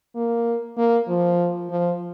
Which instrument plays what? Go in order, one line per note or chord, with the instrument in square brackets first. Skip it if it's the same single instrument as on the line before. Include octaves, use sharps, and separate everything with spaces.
[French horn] A#3
A#3
F3
F3